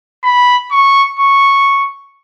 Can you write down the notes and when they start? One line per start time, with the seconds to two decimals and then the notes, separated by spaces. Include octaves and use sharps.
0.24 B5
0.71 C#6
1.19 C#6